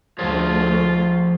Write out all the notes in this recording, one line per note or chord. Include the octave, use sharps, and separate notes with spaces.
D2 F3 A3 F4 G#4 C#5